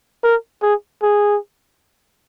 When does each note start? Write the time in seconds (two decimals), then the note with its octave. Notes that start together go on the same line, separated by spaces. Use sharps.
0.24 A#4
0.62 G#4
1.02 G#4